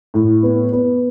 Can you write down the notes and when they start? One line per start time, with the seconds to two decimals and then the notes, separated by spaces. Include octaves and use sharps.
0.14 A2
0.43 B3
0.73 B3